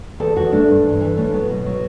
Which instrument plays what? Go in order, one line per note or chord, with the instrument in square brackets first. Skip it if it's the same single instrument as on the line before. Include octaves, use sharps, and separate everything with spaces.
[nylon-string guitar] E2 A4
E2 F#4
A3 D4
G2
E3
E3
A3 C#4
F#3 B3
B2
F#3